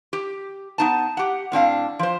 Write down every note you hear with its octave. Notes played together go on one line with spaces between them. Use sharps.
G4
B3 D#4 A5
G4 F#5
A2 C4 D4 F5
F3 C5